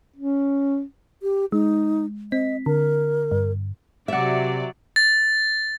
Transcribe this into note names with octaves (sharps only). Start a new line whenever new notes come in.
C#4
G4
G#3 D#4
C4 D#5 B6
D3 A#4
G2
C3 F#3 D5 E5 F#5
A6